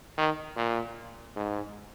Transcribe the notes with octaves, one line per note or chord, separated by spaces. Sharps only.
D#3
A#2
G#2